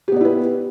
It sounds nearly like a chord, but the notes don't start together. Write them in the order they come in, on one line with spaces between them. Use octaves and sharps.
G4 B3 D5 E4 B4